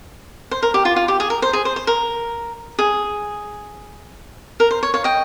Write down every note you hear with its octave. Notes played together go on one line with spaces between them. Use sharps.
C5
A#4
G4
F4
F4
G4
G#4
A#4
C5
G#4
C5
C5
A#4
G#4
A#4
C5
C#5
C#5 F5
D#5 G5